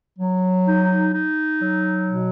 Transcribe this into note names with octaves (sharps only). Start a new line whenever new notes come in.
F#3
D#4
D#4
F#3
B2